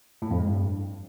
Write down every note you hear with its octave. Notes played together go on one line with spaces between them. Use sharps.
A2
F2
G#3
G2